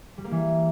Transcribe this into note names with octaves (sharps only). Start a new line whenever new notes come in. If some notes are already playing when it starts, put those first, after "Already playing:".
G3
A#3
E3